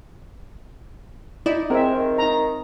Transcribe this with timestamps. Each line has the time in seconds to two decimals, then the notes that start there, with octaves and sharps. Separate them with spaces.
1.46 D#4 E4 D5
1.70 G#3 C4 A#4 E5
1.95 D#3
2.18 D#4 A#5